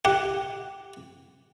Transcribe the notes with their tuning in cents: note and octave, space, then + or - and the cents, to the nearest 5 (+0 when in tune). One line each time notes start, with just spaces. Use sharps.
G4 +0 F#5 +0